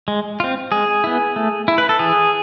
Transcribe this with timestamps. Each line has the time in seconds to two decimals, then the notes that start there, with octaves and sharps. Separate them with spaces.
0.08 G#3
0.40 C4 F4
0.72 G#3 G#4
1.04 B3 E4
1.36 A3
1.68 E4
1.78 B4
1.89 A4
1.99 E3 G#4